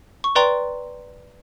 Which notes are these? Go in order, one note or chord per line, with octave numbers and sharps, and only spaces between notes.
C#6
B4 D5 G5 A#5 C6